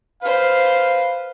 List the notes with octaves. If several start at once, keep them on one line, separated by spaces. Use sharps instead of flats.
B4 C5 F5